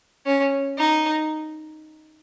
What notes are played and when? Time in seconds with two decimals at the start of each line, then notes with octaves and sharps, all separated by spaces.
0.26 C#4
0.78 D#4